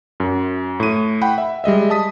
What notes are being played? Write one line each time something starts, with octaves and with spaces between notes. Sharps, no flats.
F#2
A2 D#7
F#5 G5 B5
E5
G3 G#3 D#5 E5
A5 D#6 B6